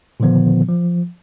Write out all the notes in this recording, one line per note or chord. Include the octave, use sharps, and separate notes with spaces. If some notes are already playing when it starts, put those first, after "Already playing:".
A#2 D3 D#3 F3 B3
F3